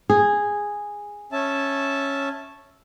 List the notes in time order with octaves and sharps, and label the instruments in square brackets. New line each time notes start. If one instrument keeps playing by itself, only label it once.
[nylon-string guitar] G#4
[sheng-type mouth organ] C#4 E5 A5